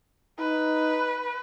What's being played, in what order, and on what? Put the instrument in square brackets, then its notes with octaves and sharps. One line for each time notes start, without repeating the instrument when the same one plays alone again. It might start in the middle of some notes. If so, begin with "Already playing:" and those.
[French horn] D#4 [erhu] B4